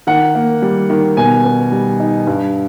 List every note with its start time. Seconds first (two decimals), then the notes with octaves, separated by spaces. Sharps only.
0.07 D#3 F#5
0.35 A#3
0.62 G3
0.90 D#3
1.17 B2 G#5
1.45 B3
1.72 G3
2.00 D#4
2.27 G2